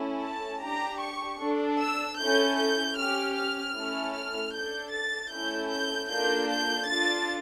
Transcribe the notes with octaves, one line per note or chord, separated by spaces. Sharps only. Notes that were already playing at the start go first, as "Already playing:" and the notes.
Already playing: A3 C#4 E4 A4
A5
D4 G4 A#5
C#6
D4 A4
E6
C#4 E4 A4 G6
G6
C#4 G4 F6
F6
A3 C#4 E4 A4
F6
D4 A4 G6
A6
A3 C#4 E4 A4 G6
G6
A#3 D4 F4 A4 G6
G6
D4 F4 A4 A6